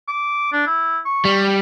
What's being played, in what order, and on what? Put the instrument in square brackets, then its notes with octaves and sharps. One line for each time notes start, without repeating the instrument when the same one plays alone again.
[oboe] D6
D4
E4
C#6
[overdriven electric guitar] G3